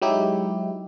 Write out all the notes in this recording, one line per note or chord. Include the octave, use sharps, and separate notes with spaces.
F#3 G#3 D#4 E4 G4